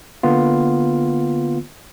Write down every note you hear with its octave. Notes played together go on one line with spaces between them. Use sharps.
D3 A#3 B3 F4